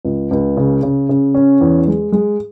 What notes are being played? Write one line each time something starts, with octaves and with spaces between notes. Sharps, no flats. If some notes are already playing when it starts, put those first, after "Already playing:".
C#2
C#2
C#3
C#3
C#3
C#4
E2
G#3
G#3